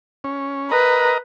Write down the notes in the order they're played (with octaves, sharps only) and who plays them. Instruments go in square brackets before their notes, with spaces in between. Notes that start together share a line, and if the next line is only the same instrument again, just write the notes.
[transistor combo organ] C#4
[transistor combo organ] A#4 D#5 A#5 [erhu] B4